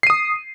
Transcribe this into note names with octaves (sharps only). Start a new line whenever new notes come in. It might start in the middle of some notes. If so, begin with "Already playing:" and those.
D#6 C7 D#7